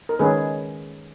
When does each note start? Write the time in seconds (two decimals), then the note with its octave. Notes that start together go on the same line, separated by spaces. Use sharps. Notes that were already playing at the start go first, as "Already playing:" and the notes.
0.09 A#4
0.19 D#3 G#3 C#4 G#4 B4